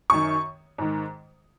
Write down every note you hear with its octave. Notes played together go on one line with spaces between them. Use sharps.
F#2 D#3 C#6
G#2 D#3